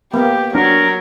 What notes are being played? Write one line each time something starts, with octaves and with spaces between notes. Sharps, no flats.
A#3 B3 G4
F#3 D4 A#4